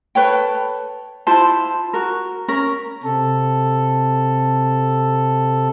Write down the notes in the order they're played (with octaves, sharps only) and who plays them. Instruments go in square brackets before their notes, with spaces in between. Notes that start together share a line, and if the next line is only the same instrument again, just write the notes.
[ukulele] A4 B4 C#5 G5
E4 F4 C5 A5
F#4 A#4
C#4 A#4
[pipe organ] C3 A4